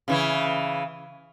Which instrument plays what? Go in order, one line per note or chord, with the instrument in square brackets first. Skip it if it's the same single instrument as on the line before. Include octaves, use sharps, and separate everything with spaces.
[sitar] C#3 E3 E4